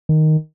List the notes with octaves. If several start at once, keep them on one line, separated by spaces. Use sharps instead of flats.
D#3